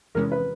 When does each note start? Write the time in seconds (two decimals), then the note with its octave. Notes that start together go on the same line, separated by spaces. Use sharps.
0.15 E2 C3 E3 G#3 C#4 A#4
0.32 B4